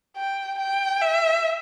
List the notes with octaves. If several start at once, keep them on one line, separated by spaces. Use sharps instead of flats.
G5
G5
E5